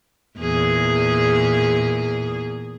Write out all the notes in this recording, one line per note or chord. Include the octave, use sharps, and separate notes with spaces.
E2 A#2 G#4